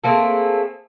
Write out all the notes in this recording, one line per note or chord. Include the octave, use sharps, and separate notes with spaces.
A3 A#3 C4 G#4